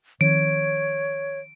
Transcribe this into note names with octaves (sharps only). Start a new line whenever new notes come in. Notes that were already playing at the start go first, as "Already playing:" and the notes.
D#3 F3 C4 C#5 D7